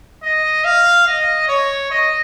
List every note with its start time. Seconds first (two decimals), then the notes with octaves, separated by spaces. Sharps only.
0.23 D#5
0.64 F5
1.07 D#5
1.48 C#5
1.91 D#5